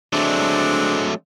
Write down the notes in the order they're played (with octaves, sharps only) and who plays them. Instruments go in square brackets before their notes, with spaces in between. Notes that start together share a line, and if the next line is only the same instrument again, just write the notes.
[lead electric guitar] F#3 A3 [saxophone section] G#3 C4 D4